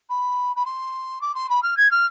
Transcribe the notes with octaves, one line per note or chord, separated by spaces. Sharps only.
B5
B5
C6
D6
C6
B5
F6
G#6
F6